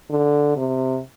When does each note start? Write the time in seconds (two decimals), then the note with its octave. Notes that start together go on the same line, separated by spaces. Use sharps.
0.10 D3
0.57 C3